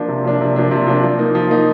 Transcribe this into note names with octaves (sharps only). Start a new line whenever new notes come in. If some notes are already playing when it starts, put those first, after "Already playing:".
Already playing: F3 A#3 D4
C3
F3 A#3 D4
C3
F3 A#3 D4
C3
F3 A#3 D4
F3
A#3 D#4
F3
A#3 D#4